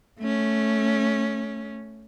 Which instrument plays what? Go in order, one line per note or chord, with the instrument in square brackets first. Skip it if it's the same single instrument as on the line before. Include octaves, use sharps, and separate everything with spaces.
[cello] A3 C#4